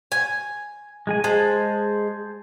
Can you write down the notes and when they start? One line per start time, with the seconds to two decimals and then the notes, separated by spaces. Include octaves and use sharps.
0.12 G#5
1.07 G#3 G#4 G#5
1.24 G#3 C5 G#5 A5